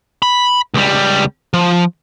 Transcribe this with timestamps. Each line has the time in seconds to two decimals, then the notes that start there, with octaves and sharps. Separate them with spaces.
0.22 B5
0.74 C#2 G3
1.54 F3